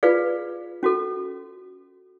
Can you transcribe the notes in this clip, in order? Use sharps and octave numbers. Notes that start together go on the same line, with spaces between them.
F4 G#4 B4 D5 F5
C#4 F#4 A4